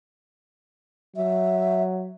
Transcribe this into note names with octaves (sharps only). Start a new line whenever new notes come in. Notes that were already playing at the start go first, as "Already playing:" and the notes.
F#3 E5